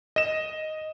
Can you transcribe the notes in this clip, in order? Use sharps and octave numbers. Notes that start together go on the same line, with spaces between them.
D#5 E7